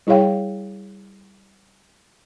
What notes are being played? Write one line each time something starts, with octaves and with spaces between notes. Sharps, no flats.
G3 E4 G#4 C#5 F5 G5